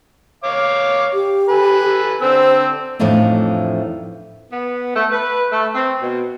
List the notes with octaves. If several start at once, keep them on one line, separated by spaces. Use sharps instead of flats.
C#5 F5 D6
G4
A4 B4 G#5
D3 C4 C5 E6
F2 A2 E3 F3 D4 D#4
B3
A3
B4
A3
C4
B2